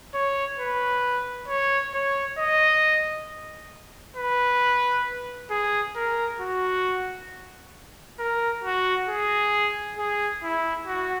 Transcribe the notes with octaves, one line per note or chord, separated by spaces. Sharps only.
C#5
B4
C#5
C#5
D#5
B4
G#4
A#4
F#4
A#4
F#4
G#4
G#4
E4
F#4